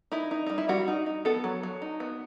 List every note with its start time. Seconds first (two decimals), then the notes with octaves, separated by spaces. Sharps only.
0.12 D#4 E4
0.31 D#4
0.46 G3 D#4
0.58 E4
0.69 G3 F#4
0.88 D#4
1.06 D#4
1.25 B3 A4
1.44 F#3
1.63 F#3
1.82 D#4
2.00 B3